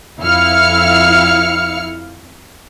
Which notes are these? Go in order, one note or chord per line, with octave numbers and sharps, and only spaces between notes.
F2 E4 F5 F6 C#7